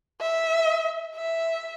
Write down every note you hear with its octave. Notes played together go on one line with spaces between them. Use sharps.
E5
E5